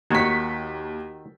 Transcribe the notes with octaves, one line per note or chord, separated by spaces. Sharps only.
D#2 D#3 F#4 C#5 B6